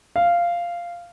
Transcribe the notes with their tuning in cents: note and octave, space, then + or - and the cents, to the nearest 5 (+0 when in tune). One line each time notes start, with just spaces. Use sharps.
F5 -10